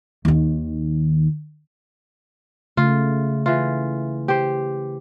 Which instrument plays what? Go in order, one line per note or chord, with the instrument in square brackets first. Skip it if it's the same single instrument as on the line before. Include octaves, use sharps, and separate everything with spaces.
[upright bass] D#2 D#3
[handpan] C#3 A3 [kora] F4
[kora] E3 F4
G4 C5